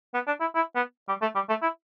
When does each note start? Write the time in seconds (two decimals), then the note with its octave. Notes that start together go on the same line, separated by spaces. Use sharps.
0.14 B3
0.27 D4
0.40 E4
0.55 E4
0.75 B3
1.08 G3
1.22 A3
1.35 G3
1.49 A3
1.62 E4